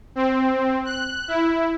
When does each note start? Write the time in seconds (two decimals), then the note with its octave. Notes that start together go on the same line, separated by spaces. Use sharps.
0.15 C4
0.85 F#6
1.28 E4